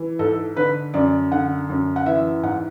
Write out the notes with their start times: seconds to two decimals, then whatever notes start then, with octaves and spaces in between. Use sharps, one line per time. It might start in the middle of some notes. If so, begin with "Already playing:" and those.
Already playing: E3
0.19 G#2 A4
0.56 D3 B4
0.94 F#2 D5
1.32 D3 F#5
1.69 F#2
1.96 F#5
2.06 E3 E5
2.43 G#2 F#5